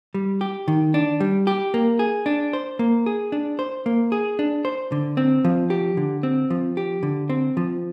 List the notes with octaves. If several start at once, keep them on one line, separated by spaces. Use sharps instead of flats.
G3
G4
D#3
D4
G3
G4
A#3
G#4
D4
C5
A#3
G#4
D4
C5
A#3
G#4
D4
C5
D3
C4
F3
G4
D3
C4
F3
G4
D3
C4
F3